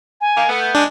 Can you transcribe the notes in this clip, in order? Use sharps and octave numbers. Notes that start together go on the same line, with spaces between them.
G#5
D#3 A#3
A3 B3
G6
G#3 D4